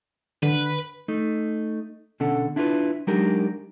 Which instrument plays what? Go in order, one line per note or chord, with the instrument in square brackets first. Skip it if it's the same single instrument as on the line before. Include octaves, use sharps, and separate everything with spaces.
[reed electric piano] D3 [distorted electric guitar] B4
[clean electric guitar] A3 D#4
B2 D3 C#4 A4 F#5
D4 E4 F4 A4 B4
F#3 G#3 D4 D#4 G4 A#4